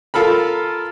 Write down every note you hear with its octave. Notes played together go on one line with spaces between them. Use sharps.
F4 A4 A#4 B5